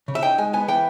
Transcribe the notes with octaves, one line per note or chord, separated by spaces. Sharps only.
C#3
E5
D#4 G5
G#3 G#5
B3 G#5
E3 G5